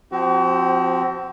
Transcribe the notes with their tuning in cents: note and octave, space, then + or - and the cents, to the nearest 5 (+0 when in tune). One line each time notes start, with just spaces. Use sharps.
F3 +15 C4 +0 F#4 +40